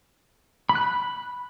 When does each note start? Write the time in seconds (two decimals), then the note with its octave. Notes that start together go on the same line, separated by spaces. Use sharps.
0.69 B5
0.75 F#6
0.81 B5